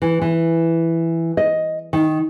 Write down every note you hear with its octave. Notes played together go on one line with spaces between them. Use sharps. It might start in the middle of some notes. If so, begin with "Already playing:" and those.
E3
E3
D#5
D#3